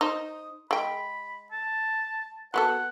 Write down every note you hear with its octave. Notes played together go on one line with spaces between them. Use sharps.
D#4 C5 D#6
G#3 G5 B5
A5
F#3 B3 A4 F#5